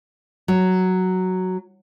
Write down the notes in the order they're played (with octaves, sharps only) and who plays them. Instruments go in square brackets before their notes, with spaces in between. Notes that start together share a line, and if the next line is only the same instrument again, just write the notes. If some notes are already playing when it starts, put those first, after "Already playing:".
[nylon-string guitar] F#3